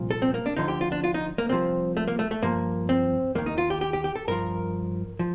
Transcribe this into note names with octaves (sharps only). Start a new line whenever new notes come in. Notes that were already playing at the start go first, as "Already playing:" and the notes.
Already playing: C2 A#2 F3
A4
C4
A#3
D4
D2 D3 F3 D#4
G4
F4
D4
F4
D#4
A#3
C2 C3 F3 C4
A3
A#3
A3
A3
G2 F3 A#3
C4
D#2 D#3 A#3
D#4
F4
G4
G4
G4
G4
A4
G2 F3 A#4
F3